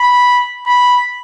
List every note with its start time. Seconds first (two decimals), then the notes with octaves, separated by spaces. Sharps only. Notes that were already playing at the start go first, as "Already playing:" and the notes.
Already playing: B5
0.66 B5